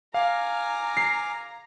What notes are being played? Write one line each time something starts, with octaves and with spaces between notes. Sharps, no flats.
F5 G#5 A#5 D6 F6
C7